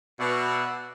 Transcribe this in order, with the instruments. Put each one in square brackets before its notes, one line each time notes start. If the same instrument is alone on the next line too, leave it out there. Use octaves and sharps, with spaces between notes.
[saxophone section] B2 [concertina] D5 E5 F#5